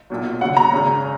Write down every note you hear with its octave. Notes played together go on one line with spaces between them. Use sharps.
B1 A#2 F#3
D#2 C#3 F#3 F#5
A#5
G#1 F#2 C#3